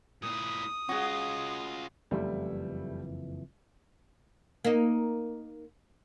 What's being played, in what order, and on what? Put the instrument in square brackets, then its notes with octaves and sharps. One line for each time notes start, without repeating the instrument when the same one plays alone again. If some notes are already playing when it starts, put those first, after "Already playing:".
[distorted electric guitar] A#2 E4 [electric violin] D#6
[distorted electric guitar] C#4 F4 [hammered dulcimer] F#4 G#4
[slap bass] F#1 F2 E3 [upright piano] G3 A3 E4
[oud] A#3 D#4